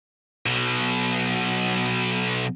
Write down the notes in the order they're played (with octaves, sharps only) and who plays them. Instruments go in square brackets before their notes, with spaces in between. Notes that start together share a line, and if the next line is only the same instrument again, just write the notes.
[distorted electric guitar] B1 B2